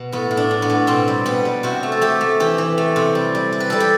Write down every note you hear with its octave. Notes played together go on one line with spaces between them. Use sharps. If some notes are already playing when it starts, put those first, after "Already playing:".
Already playing: B2
A2 B3
A2
D4
A2
B3
A2
B2 C4
G3
B2 B3
G3
C3 F#4
A3
A4
A3 G4
A3
E3 G4
E3
A3
C3
G3
G3
G3
B4
G3 A4
G4